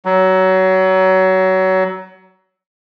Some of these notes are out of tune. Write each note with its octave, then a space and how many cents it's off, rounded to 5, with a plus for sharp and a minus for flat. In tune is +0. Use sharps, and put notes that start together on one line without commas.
F#3 +25